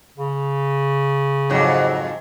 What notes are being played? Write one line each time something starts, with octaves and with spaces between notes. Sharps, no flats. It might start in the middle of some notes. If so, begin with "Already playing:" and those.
C#3
F2 G#2 F#3